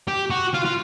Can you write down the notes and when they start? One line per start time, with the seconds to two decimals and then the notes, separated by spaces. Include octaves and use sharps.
0.08 G4
0.30 F#4
0.54 F4
0.65 F4